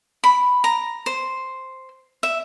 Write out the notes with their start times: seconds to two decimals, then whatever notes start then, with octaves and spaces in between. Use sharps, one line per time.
0.24 B5
0.64 A#5
1.06 C5
2.23 E5